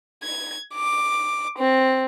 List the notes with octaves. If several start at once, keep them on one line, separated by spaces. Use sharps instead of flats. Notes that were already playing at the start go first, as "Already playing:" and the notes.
G#6
D6
C4